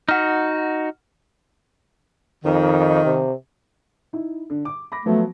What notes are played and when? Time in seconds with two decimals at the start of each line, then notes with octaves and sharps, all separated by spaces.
0.09 D#4 F#4 F#5 F6
2.45 F2 D#3
3.04 C3
4.13 D#4 E4
4.50 D3
4.65 D6
4.92 B5 D6 A#6
5.06 F3 F#3 A3 B3